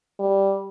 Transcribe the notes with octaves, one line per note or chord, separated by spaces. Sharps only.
G3